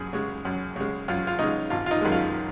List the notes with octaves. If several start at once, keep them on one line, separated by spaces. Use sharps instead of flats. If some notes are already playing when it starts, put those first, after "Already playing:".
Already playing: F#2 C#3 G#4
C#3 G#3
F#2
C#3 G#3
F#2 F4
F4
C#3 G#3 D#4
G#1 F4
F4
D#4
F#2 D#3 G#3
F4